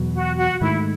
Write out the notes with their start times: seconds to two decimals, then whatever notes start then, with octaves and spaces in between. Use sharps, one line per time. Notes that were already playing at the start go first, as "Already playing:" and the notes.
Already playing: E2 B2 F#3
0.13 F#4
0.37 F#4
0.61 G#2 D#3 A3 E4